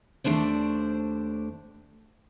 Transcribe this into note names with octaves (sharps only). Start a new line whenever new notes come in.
D#2 A3 D4 C5 D5